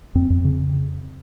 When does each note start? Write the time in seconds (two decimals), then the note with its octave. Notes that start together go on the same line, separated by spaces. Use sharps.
0.15 F2 C4
0.30 F2
0.45 C#3